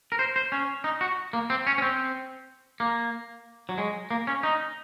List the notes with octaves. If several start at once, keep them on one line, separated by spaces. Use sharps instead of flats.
A#4
C5
C5
C#4
D#4
F#4
A#3
C4
C#4
C#4
C4
A#3
F#3
G#3
A#3
C#4
D#4